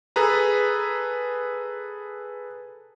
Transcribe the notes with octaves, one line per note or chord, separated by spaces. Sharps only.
G#4 A4 B4 A#5